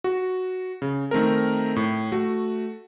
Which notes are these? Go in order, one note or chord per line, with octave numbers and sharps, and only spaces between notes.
F#4
C#3
D#3 A3 C4 A#4
A2
A3 F#4